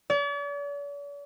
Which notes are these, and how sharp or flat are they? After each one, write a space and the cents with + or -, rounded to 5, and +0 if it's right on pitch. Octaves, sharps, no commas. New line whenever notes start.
D5 -45